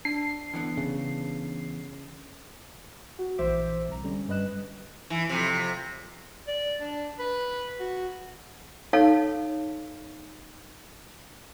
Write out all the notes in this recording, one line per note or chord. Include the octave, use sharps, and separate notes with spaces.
D4 C7
D3 E3 B3
C#3
F#4
A#1 E3 C5 E5 D6
C2 A#5
D3 G3 C#4
G2 G3 B4 D#5 F#6 E7
E3
F2 C3
D5
D4
B4
F#4
D#4 A4 C#5 F5